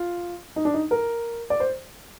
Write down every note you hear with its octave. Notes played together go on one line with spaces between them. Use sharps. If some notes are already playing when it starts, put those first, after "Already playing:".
Already playing: F4
D#4
D4
D#4
A#4
D5
C5